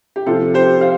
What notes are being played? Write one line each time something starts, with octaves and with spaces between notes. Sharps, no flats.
G4
C3 F3 F4 A4
G4 C5
C5 F5